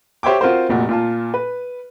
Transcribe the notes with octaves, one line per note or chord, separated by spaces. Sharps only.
G4 C5 C#5 E5 G5 D6
C4 F4 F#4 A#4 C5
F1 A#2 F#4
A#2 F4 A5
B4